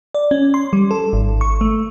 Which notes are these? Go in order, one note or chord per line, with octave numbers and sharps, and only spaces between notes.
D5
C#4
C6
G3
A4
G#1
C#6
A3